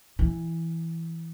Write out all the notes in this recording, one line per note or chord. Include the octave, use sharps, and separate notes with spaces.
E3